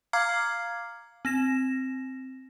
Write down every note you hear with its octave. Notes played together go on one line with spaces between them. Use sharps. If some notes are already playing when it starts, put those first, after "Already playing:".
F5 A#5 D6 F6 G#6 C7
C4 A#6 E7